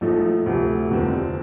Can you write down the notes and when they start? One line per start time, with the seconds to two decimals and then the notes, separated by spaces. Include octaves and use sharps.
0.01 A#1 A#2 F3 A3 D#4
0.46 D2 C3 F3 A3
0.90 F1 D#2 D3 F3 C4